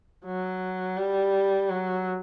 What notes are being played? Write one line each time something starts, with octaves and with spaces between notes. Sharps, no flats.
F#3
G3
F#3